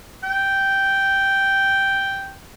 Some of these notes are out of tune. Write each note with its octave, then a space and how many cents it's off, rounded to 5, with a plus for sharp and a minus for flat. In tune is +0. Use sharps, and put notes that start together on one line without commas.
G5 -5